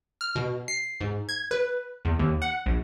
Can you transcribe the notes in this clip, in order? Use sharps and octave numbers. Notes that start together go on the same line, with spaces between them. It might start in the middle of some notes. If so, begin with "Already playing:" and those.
F6
B2
C7
G#2
G#6
B4
E2
D#2
F#5
A#1